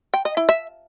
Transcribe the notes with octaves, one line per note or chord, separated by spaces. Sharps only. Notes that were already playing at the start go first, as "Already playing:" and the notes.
G5
D#5
E4
E5